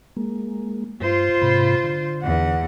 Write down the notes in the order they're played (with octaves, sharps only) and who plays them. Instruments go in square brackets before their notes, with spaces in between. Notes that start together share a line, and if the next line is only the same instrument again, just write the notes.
[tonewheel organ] G#3 A#3
[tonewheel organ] G2 [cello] F4 C5
[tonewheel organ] G#2 C3 B5
D3
[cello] E2 F#5